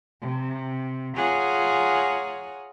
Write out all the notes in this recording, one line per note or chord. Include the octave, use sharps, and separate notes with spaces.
C3
F4 G#4 C#5 F#5 G#5 A#5